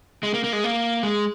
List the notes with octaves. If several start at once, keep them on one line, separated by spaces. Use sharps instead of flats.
G#3
A#3
A#3
G#3
A#3
G#3